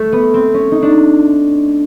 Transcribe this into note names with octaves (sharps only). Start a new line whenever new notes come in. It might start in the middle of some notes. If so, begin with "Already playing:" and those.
Already playing: A3
B3
C4
C#4
D#4
D4